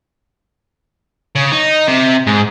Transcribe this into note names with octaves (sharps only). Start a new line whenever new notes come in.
C#3
D#4
C3
G#2